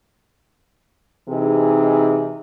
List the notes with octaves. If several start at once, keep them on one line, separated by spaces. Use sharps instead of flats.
C3 E3 D#4 G#4